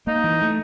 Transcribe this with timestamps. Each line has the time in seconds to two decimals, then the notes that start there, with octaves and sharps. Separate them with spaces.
0.07 A#3 D#4
0.24 E3
0.42 A3